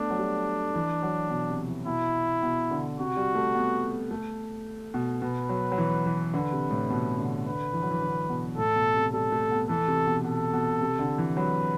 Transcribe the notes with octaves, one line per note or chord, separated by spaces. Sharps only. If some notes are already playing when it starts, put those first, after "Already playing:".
Already playing: A3 B3 D4
F#3
G3
E3
F#3
B2
C3
E3
B2 E4
B2
D3
C3 F#4
G3
A3
B3
A3
B2
B2 B4
F#3
F#3
E3
E3
D3 B4
C3
A2
B2
D3
D3 B4
E3
F#3
E3
D3
B2
A2 A4
B2
C3
G3 A4
A3
B3
E3 A4
C3
B2
B2 A4
B2
C3
D3
E3
F#3 B4